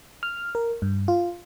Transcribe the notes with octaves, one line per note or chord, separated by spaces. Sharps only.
F6
A#4
G2
F4